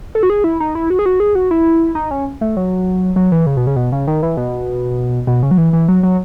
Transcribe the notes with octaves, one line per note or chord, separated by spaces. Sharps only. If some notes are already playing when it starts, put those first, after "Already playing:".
A4
F#4
G#4
E4
D#4
E4
F#4
G#4
F#4
G#4
F#4
E4
D#4
C#4
A3
F#3
F#3
E3
C#3
B2
C#3
B2
C#3
D#3
E3
B2
B2
C#3
F#3
E3
E3
F#3
F#3